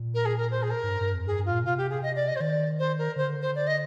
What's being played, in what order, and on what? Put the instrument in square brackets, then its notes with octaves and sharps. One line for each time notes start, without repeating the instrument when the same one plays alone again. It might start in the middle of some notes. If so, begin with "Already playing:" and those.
Already playing: [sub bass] A#2
[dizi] A#4
G#4
A#4
C5
G#4
A#4
[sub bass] G#2
G2
G2
F2
[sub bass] G2 [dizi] G#4
[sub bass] G2
[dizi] F4
[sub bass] A#2
[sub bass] C3 [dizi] F4
[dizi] G4
G#4
D#5
D5
D#5
C5
[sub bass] D#3 [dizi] D5
[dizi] C5
A#4
[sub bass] D3 [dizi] C5
[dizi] C5
D5
D#5